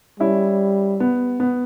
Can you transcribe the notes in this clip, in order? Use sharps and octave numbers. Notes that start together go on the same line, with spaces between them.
G3 C#4 E4
B3
B3